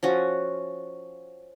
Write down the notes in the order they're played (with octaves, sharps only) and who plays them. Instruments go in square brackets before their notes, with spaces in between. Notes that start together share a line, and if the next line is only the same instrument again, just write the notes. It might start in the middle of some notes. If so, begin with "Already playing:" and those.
[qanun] F3 C#4 F#4